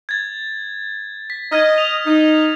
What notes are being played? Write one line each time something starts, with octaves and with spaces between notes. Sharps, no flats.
G#6 A6
B6
D#5 F6 G#6
F7
D#4